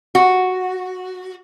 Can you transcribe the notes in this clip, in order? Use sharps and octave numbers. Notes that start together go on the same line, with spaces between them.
F#4